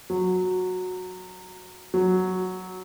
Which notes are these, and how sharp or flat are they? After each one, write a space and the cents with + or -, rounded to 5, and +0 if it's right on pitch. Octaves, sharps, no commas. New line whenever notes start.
F#3 -10
F#3 +0